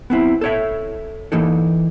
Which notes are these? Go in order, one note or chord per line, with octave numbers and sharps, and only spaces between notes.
B3 C4 E4
A4 C#5 E5
E3 A#3 D#4 A4